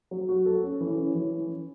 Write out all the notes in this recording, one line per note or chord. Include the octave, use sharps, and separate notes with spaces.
F#3
F#4
A4
C#4
E3
C#4
E3